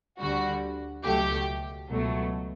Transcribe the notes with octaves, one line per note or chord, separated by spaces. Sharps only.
D2 D3 G3 F#4
C#2 B2 F#3 A3 G4
C#2 B2 F#3 A3